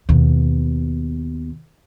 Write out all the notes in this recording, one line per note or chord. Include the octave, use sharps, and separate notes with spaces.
D#2 B2